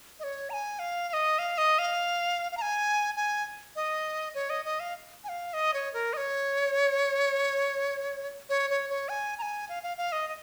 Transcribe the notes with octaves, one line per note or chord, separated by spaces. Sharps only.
D#5
C#5
A#5
G#5
F5
F5
D#5
F5
D#5
F5
F5
A#5
G#5
G#5
D#5
C#5
D#5
D#5
F5
G#5
F5
D#5
C#5
A#4
D#5
C#5
C#5
C#5
C#5
G#5
A#5
G#5
F5
F5
F5
D#5
D#5